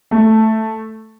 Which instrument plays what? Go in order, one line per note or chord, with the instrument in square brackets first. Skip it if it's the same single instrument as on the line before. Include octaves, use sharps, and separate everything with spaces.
[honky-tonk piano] A3